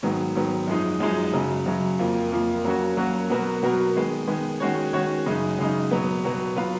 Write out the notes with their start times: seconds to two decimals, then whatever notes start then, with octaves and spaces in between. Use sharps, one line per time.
0.03 G#2 D#3 F#3 B3
0.35 G#2 D#3 F#3 B3
0.67 F#2 F3 G#3 D#4
1.00 F#2 F3 G#3 D#4
1.33 F#2 C#3 F#3
1.66 F#2 C#3 F#3
1.99 F2 F3 A#3
2.32 F2 F3 A#3
2.65 F#3 A#3 C#4 F#4
2.97 F#3 A#3 C#4 F#4
3.30 B2 F#3 B3 F#4 A#4
3.63 B2 F#3 B3 F#4 A#4
3.95 D#3 G#3 B3
4.28 D#3 G#3 B3
4.60 D#3 G#3 C#4 F#4 C#5
4.93 D#3 G#3 C#4 F#4 C#5
5.26 F#2 C#3 G#3 D#4
5.58 F#2 C#3 G#3 D#4
5.91 B2 F#3 B3
6.24 B2 F#3 B3
6.56 F#3 B3 F4 B4 F5